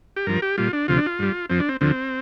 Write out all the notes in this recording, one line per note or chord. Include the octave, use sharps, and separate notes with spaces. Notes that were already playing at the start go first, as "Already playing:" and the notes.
G4
G2 F3 A#4
G4
A#2 G3 F4
D4
D2 C3 F3 F4
D4
F4
G2 G3
F2 F3 C4
D4
C4
D2 D3 F3 C4